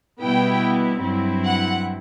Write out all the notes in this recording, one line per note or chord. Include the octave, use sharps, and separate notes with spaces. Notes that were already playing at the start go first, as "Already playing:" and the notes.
B2 G3 B3 E4 G5
G2 F#3 C4 E4
F#5